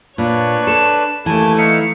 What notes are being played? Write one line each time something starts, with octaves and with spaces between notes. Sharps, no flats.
A#2 D4 B4 C#5
A4 E7
D#2 E3 A3 G#5 A5
D#4 E5 F5 C#7